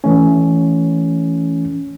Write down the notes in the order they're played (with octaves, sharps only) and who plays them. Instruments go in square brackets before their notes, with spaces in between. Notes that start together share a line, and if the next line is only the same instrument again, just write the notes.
[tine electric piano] E3 A3 C#4